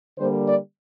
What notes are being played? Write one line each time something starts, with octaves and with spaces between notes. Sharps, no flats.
D3 G3 A#3 C5
D5